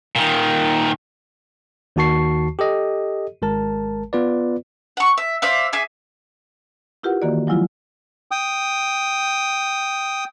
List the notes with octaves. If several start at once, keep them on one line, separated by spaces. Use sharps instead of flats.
A#2 D#3
D#2 D#3 F#4 A5 C#6 C7
G4 A4 D#5
G#1 G#3 A#4 A5
B3 F4 B4 D5
F#5 C#6
E5
C5 D5 E5 F5
G#4 E5 G#5 D6
E4 F4 G4 A#4 B4 F#5
D#3 E3 A#3 F#4 D5
F3 F#3 G#3 E4 F4
G5 D#6